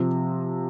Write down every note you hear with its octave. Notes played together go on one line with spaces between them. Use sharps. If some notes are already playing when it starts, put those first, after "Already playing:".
Already playing: C3 F3